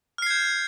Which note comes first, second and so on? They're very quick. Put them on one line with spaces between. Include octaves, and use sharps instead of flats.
F6 C7 G#6 G6